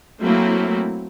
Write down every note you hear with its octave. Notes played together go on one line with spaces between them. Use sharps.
F#3 A3 A#3 C4 E4